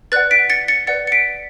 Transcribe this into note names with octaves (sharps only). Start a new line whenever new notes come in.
B4 D5 F#5 F#6 A6
B6 D7
A6 C#7
A6 C#7
B4 D5 F#5 A6 C#7
C#7
B6 D7